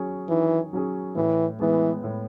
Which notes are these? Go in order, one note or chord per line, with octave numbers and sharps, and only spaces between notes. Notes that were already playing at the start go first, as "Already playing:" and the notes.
Already playing: F#3 C#4 G#4
D#3 E3
F#3 C#4 G#4
A2 E3
E3 G#3 B3
A2